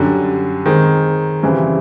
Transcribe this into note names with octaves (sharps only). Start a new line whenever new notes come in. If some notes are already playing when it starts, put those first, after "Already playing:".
Already playing: F#2 D3 G3
D#3 G#3 C4
F#2 C#3 E3 G3 C4